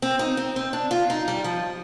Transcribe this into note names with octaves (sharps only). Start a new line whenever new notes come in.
C4
D#4
C4
C4
D4
F4
D#4
G3
F3